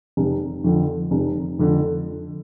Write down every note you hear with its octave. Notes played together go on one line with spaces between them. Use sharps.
F1
F2 D3
F1
F2 D3